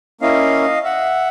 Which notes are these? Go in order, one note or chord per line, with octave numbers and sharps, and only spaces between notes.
A#3 C#4 E4 D#5 F5
E5 F#5